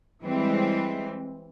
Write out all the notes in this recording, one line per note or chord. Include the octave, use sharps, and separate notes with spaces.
E3 G3 G#3 C4